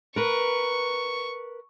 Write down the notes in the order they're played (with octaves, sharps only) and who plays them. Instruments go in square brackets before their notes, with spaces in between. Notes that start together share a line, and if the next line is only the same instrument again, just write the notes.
[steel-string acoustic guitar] A#4 B4 [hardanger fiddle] C#6